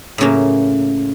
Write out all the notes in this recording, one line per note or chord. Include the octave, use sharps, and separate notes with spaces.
A2 C#3 F#3 A#3 C#4